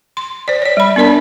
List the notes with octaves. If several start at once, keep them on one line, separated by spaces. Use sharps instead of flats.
C6
C5 D5
C#5 D5
G3 B5
B3 D4 A#4 D5 A5